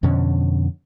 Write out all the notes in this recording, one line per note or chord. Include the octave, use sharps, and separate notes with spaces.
F2 B2 D3 C#4